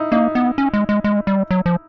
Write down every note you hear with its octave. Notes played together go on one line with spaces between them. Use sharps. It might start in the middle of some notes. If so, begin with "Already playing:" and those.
Already playing: D#4 E4
A#3 D#4
B3
C#4
G#3
G#3
G#3
G3
F#3
F3